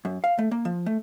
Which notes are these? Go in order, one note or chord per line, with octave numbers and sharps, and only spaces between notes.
F#2
F5
A3
A#3
F3
A3